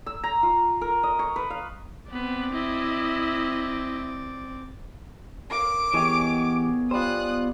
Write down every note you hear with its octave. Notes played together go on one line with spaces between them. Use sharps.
E6
A#5
F4
A#4
D#5
C#6
B4
F5
B3 C4 B4 D5
E4 D#5
A#4 F5 D6
E3 B3 G4 G#4 C#5 D#5
G3 F4 C5 D#6 F#6